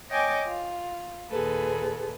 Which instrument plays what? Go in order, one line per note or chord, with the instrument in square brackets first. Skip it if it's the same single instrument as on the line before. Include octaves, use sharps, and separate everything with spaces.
[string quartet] C#5 D#5 G5 G#5 D6
F4
D#2 A#2 G#4 A4 B4